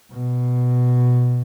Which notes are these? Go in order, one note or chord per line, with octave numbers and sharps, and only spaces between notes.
B2